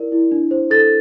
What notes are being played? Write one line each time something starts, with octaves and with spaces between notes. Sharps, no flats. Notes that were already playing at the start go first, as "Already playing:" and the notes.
Already playing: E4 A#4 D5
E4
D4
C5
A4 A6